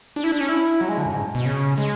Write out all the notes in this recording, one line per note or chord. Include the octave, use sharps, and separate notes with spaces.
D4
E4
D4
C#4
E4
F#3
G#3
D3
F#2
G#2
B2
C#3
G#3